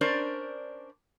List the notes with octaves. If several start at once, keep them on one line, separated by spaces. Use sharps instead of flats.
C#4 D4 A#4 C5 D5